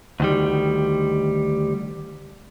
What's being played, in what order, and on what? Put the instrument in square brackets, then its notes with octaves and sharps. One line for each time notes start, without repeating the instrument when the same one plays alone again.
[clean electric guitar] D2 D#3 G3